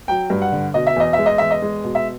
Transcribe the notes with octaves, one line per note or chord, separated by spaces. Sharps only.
F#3 G5
G2
F#5
D3
B2 D#5
E5
E2 D#5
E5
G#3
D#5
E2 E5
D#5
G#3
B2
E5